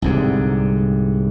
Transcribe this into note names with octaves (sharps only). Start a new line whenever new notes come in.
C2 G#2 D3